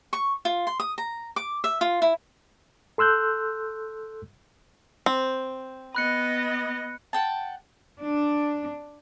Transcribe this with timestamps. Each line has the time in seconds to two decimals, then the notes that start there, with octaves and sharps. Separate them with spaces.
0.13 C#6
0.45 F4
0.67 C6
0.80 D#6
0.98 A#5
1.36 D6
1.64 E5
1.81 F4
2.02 E4
2.98 A4 C6 E6 F#6 G6
5.06 C4
5.95 B3 D#5 B5 F#6 C#7
7.13 F#5 G5 A5
8.00 D4